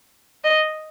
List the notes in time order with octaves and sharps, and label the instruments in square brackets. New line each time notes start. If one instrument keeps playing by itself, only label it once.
[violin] D#5